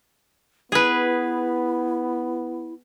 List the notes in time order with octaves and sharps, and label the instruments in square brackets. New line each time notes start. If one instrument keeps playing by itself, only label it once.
[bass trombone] B3 [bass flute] E4 [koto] G#4 B4